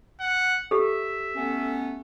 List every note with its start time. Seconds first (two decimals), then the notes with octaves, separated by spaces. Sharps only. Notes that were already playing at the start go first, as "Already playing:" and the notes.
0.20 F#5
0.71 G4 A4 E5
1.35 A3 B3 C#4